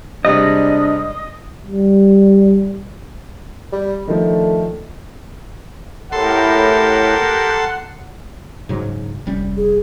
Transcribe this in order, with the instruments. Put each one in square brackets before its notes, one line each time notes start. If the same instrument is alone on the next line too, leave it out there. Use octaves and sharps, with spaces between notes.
[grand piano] C3 G3 G#3 [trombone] D4 [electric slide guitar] D#5
[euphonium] G3
[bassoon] G3
[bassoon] D3 [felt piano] D#3 F3 [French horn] A3
[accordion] A2 [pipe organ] G4 A#4 [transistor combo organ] A4 C6 [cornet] F#5
[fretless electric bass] G#2 C#3 F#3
F1 G3 C#4
[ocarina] G#4